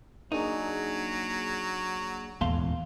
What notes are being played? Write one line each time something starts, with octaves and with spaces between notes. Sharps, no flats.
F#3 A#3 D4 D#4 G#4
D#1 E2 G#2 A3 F5 C6